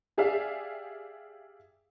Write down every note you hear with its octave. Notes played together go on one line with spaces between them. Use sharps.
G4 G#4 D5 E5 F5